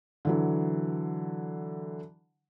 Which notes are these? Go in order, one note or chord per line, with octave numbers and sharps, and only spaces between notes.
D3 E3 F#3